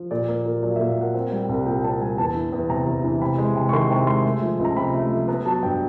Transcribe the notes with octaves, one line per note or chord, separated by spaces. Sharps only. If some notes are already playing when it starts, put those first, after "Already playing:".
Already playing: F3
A#2 D5
A#3
A#2
F#3 D5
F5
A#2 E5
F5
A#3 F#5
C4
G3
C2
A#2 G5
C4 A5
G3 G#5
E2 A5
E3
E2
C3 A#5
E2
E3
C3 B5
G#3
C3
C#6
D#3 C6
C3 C#6
G#3 C6
A3
F3
C#2
A#5
C3 B5
A3
F3
B3 A#5
F#3 A5
G2 G5